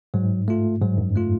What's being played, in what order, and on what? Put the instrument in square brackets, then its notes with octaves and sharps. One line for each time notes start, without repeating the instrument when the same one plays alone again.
[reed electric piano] G#2 [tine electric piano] F#3
[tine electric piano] A3 F4
[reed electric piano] G#2 [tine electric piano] F#3
[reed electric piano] F#2
[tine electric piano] A3 F4